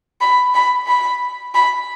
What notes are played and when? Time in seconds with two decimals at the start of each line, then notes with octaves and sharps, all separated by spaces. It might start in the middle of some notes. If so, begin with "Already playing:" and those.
0.21 B5
0.54 B5
0.87 B5
1.55 B5